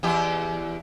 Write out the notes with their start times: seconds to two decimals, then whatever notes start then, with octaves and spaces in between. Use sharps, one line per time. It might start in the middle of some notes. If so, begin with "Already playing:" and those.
0.03 E2 G4